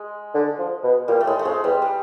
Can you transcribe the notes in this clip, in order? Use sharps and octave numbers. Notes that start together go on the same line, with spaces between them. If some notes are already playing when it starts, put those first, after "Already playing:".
Already playing: G#3
D3
F3
B2
A#2 G3
A3
A2 G#3
A3
F2 G#3
E2 G3
G3